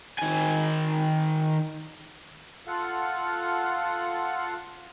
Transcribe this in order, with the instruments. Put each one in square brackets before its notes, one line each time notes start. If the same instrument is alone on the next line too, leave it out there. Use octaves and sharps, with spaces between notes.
[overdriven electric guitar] D#3 G#5
[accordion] F4 A4 F5 F#5